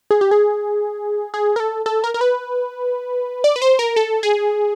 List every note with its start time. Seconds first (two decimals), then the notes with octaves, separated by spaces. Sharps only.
0.11 G#4
0.21 G4
0.31 G#4
1.34 G#4
1.56 A#4
1.60 A4
1.86 A4
2.04 A#4
2.14 A#4
2.21 B4
3.44 D5
3.56 B4
3.62 C5
3.79 A#4
3.96 A4
4.23 G#4